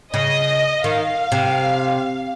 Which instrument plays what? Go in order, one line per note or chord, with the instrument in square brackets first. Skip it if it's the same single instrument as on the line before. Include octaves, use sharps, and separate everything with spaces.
[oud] C#3 [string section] D#5
[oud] D#3 [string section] F5
[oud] C3